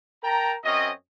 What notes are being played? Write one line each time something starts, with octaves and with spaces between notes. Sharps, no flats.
A#4 G5 A5 A#5
F#2 C4 C#4 D#5